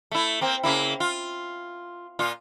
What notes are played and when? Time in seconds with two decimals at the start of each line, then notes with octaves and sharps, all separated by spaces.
0.11 A3 E4
0.41 A#3 C4
0.63 C#3 A#3 E4
1.00 F4
2.19 A#2 F4